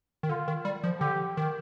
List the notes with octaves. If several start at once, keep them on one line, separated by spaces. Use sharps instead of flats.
D#3
D3 F4
D#3
G3
F3
D3 G4
D#3